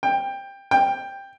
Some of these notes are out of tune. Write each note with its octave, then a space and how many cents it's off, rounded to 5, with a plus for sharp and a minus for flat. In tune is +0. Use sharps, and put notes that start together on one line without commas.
G5 +15
G5 +10